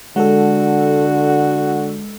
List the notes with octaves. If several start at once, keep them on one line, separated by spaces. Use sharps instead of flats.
D3 G#3 F#4 A4